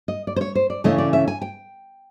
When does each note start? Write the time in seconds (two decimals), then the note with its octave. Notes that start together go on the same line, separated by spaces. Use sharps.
0.08 D#5
0.27 D5
0.36 C5
0.41 C#5
0.55 C5
0.70 D5
0.84 C#3 E3 A3 C#4 E4 D#5
0.98 D5
1.13 E5
1.28 G#5
1.42 G5